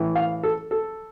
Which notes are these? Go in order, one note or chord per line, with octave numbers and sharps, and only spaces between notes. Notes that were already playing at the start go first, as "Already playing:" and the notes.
Already playing: A2 E3
F5
A4
A4